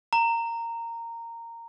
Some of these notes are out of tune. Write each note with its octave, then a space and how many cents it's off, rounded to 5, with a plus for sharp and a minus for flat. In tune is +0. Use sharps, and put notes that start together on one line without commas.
A#5 -15